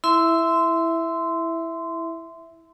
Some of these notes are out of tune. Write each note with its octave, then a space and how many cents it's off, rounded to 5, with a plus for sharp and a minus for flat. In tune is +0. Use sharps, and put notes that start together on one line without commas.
E4 +0 E5 +0 C6 -20